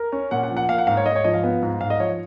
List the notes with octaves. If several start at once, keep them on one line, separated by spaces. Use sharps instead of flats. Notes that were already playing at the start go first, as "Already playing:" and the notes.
Already playing: A#4
C#4
A#2 F#5
F#5
F3
F#5
A#3 F5
F#5
G#2 F5
C#5
G#2 D#5
C#5
F3 D#5
F5
B3
G#2
G#2 F5
D#5
F3 C#5